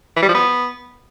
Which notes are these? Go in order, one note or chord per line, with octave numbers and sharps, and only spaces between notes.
E3
G3
F3
B3